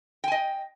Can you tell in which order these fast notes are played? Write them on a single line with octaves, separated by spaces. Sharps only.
G5 G#5 D#5